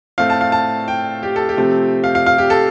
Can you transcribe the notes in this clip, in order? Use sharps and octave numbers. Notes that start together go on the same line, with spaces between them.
A2 A3 C4 F5
A5
F5
A5
G5
G4
A4
G4
C3 F3 A3 C4
F5
F5
F5
G4
A4